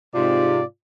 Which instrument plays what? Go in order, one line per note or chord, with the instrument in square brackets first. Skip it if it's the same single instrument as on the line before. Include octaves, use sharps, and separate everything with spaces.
[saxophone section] G#2 C3 [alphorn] F4 [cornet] D5